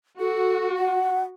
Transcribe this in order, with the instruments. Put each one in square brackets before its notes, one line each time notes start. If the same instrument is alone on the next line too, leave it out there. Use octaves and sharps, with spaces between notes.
[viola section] F#4 [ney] A4
[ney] F#5